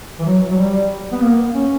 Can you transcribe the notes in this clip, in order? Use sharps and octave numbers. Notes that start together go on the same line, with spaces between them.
E3
F#3
F#3
G3
B3
A#3
C#4